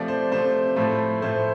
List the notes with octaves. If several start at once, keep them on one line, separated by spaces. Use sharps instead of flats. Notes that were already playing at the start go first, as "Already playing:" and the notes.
Already playing: C3 F3 A3 D5
C5
C3 F3 A3 C5
A2 F3 A3
A2 F3 A3 C5